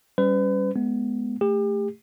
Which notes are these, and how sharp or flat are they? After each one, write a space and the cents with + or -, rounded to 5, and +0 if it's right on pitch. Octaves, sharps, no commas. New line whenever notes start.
G3 +0 C#4 +0 B4 +40
G#3 +25 B3 +0
A3 +0 G4 +35